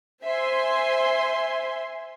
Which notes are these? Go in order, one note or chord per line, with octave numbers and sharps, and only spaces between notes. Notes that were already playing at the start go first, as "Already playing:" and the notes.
C5 E5 G#5 C6